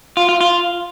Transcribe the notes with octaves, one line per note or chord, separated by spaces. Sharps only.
F4
F4
F4